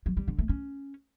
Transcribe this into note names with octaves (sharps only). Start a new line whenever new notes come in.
F#3
G3
D3
A3
C#4